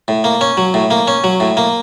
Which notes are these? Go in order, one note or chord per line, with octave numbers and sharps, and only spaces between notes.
A2
A#3
C#4
F#3
A2
A#3
C#4
F#3
A2
A#3